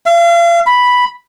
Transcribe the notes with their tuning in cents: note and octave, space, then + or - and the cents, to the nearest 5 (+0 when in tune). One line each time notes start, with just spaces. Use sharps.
F5 -40
B5 +0